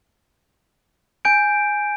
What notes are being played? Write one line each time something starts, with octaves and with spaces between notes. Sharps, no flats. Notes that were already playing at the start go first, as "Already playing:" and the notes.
G#5 G6 D7